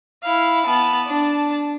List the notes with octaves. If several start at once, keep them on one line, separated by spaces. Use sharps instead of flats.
E4 F5
B3 A5
D4 A5